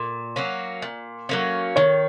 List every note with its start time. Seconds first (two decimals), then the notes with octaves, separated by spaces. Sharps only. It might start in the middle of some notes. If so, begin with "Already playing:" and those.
Already playing: A#2
0.36 F#3 A#3 C#4
0.82 A#2
1.29 F#3 A#3 C#4
1.76 D#3 C#5